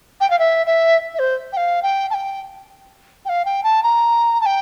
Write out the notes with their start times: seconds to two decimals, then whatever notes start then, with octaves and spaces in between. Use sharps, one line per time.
0.20 G5
0.30 F5
0.39 E5
0.66 E5
1.14 E5
1.19 C5
1.53 G5
1.57 F5
1.83 G5
2.10 A5
2.14 G5
3.25 G5
3.29 F5
3.45 G5
3.64 A5
3.83 A#5
4.41 A5
4.46 G5